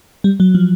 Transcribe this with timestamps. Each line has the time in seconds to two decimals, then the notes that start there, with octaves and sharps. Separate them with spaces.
0.24 G3
0.40 F#3
0.55 F3